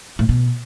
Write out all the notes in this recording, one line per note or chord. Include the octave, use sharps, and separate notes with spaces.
A2
B2